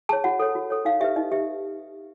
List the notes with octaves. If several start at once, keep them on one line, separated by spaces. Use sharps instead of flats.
G#4 C#5 A5
F#4 F#5
A4 C#5
F#4
A4 C#5
D#4 F5
G4 B4 E5
D#4 D#5
G4 B4 E5